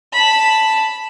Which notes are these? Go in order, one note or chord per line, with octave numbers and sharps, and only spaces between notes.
A5 B5